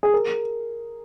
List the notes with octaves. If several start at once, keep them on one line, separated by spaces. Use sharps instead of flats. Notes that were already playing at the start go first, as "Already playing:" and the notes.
G#4
A#4